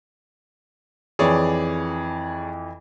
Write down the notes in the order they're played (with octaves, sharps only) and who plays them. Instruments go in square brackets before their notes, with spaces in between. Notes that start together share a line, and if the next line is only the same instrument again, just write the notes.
[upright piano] F2 E3 [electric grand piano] G#4 C#5 D5